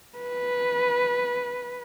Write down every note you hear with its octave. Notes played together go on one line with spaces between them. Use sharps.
B4